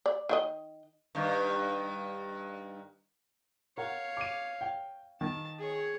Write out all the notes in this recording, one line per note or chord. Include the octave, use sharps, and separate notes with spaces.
D5
D#3 F#4 D#5
G2 D#3
A#4 C#5 F5 F#5
D6 D#7
G5
D#3 A5
G#4 C#5